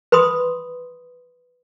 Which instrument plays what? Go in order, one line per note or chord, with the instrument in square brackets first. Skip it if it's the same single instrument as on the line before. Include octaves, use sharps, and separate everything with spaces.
[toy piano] B4 B5 C6 D#6